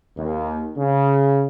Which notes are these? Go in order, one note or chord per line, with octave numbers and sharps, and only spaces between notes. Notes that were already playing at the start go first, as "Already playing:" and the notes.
D#2
C#3